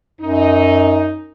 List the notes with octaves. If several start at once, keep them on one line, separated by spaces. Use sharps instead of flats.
F#2 D#4